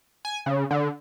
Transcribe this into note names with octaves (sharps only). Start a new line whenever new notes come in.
G#5
C#3
D3